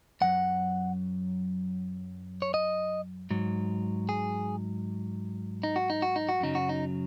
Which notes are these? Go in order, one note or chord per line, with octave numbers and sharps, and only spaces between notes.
F#2 F#3 F#5
C#5
D#5
G#2 F#3
G#4
D#4
F#4
D#4
F#4
D#4
F#4
F#2 C#3 F#3 D#4
F#4
D#4